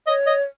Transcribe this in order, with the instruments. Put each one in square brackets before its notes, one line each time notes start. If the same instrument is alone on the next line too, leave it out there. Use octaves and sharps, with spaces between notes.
[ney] C#5 [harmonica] D#5
[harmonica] D#5